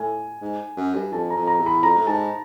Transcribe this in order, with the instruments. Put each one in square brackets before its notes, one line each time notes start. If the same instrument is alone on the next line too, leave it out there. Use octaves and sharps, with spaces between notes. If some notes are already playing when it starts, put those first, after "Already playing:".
Already playing: [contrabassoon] A2 [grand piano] G#5
[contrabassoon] G#2
F#2
G2
[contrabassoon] F2 [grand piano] A5
[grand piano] A#5
[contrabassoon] F2
[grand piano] A#5
[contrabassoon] E2
[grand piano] B5
[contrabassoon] F2 [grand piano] A#5
[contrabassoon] A2
[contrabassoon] G#2 [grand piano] A5